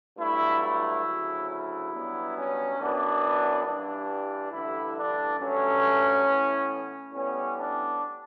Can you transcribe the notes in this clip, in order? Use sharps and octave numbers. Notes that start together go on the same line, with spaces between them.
G2 F#3 A3 E4
E4
D2 C#3 F#3
E4
G2 F#3 B3
C#4
F#2 E3 B3 D4
G2 E3 G3 D4
A1 G2 D3 E4
D4
G2 F#3 A3 C#4
A2 E3 B3
A2 G3 B3 C#4
D4